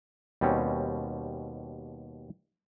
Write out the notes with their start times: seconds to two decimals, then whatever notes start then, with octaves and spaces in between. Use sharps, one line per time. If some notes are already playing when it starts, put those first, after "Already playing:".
0.41 D#2 B2 G3 C4 C#4